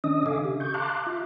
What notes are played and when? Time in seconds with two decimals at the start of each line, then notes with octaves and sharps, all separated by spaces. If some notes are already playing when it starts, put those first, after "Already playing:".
0.04 D#3 C#4 D4 D#5 D#6
0.26 C#3 A4 E5 F5 G#5 D6
0.44 G4
0.60 C#6 G6
0.74 F5 A5 A#5 C6 D6 F#6
1.06 F4 E5